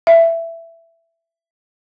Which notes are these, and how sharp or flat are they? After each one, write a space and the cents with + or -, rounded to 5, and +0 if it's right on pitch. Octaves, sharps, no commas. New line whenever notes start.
E5 +10